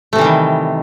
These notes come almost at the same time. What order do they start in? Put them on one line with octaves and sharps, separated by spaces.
A3 C3 E3 G3 D#3